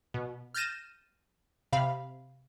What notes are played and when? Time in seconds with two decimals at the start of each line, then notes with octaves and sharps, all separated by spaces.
0.14 B2
0.54 F6 G6 A6 A#6 D#7 E7
1.73 C3 F5 B5